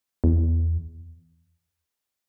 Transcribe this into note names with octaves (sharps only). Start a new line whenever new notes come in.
E2